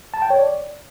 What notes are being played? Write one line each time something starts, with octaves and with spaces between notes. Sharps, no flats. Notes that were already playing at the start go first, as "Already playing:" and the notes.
A5
G5
C#5
D5